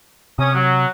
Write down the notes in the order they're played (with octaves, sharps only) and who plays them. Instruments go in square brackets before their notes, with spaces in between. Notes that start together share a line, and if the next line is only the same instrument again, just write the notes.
[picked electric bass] C3 [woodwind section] C#4 D#6
[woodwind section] F#3